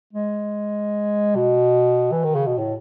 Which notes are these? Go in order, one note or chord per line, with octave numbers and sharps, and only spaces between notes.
G#3
B2
E3
D#3
C#3
B2
A2